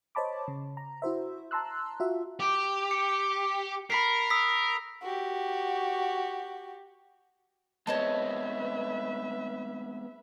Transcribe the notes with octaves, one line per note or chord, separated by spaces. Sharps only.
C5 C#5 D#5 A5 B5 D6
C#3
A#5
E4 F#4 C5 E5
A5 A#5 C6 E6 F#6
F4 F#4 E5
G4
C#7
A#4 B5 B6 C7
D#6 E6 B6
F#4 G4
G#3 B3 C4 B4 C#5 D#5 E5 A5